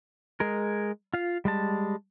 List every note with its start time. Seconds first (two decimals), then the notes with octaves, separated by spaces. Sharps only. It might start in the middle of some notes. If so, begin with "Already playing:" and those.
0.40 G#3 G#4 A#4
1.14 F4 F5
1.45 G3 G#3 A5